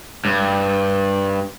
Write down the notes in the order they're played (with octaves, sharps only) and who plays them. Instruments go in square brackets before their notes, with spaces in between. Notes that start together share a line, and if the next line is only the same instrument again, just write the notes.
[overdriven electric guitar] G2